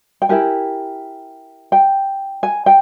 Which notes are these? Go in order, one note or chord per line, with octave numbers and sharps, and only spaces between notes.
G5
E4 G4 A#4 G#5
G5
G#5
G5